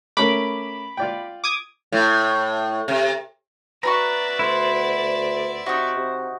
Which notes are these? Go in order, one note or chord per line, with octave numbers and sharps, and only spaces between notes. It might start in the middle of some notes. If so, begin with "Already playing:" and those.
A3 C#4 A#4 B5 D6
F4 D5 G5
D6 D#6 G#6
A2
C3
B3 F#4 D5 E5 A#5 C#6
D2 E4 C5
C3 D#4 F#4
C3